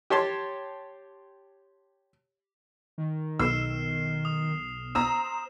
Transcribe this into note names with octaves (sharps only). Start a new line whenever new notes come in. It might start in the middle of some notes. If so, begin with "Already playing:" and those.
G4 C#5 A5 C6
D#3
B1 E6 F6 C7 E7
D#6
C5 A#5 D#6 E6 E7